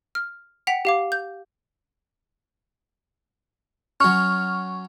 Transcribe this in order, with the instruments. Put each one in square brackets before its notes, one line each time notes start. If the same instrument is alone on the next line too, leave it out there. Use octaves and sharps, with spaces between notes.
[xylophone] F6
F#5 G5 B6 F7
G4 F5 D6
G6
[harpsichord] F#3 C#4 [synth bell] C#6 [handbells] F6